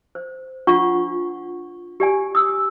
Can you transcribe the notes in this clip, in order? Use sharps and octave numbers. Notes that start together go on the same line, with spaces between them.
C5
D4 F4 F#5 C#6
G4 D5 G#5
D#6 E6